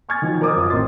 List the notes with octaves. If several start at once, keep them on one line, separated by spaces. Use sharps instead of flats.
G#5 C#6 F6 G#6 A6
D#3 F3 F#3
A#4 C5 D#5 D6 D#6
F#2 F4 D6 D#6
A1 C4 D#5 C6 A6